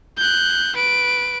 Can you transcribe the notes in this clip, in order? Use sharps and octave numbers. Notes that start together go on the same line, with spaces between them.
F#6 G6
B4 D7